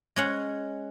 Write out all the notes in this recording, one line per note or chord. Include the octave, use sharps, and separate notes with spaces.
G#3 C#4 F#5